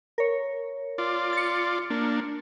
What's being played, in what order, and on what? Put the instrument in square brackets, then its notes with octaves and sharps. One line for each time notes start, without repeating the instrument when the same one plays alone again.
[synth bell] A#4 C#5
[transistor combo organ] F4 D5
[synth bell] A6 C#7
[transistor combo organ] A#3 D4